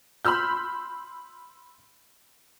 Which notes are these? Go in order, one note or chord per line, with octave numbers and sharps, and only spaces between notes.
B5 C6 E6 F6 G6